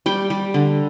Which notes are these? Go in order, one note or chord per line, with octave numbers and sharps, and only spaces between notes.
G3 G5
G3
D3